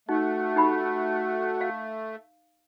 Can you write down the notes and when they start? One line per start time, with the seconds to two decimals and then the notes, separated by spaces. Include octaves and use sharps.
0.09 A3 D#4 F#4
0.56 D#4 G4 B5
1.61 F5